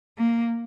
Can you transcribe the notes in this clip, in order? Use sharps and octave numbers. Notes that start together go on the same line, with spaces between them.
A#3